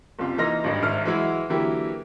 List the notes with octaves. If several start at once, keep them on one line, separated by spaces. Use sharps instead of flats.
F#1 C3 F4
E3 A#3 D#4 C6 F6 A#6
G#1 G2 D#4
G#1 G#2 E5 F6
E3 F#3 G#3 E4 F#4
D3 E3 F#3 A#3 E4 G4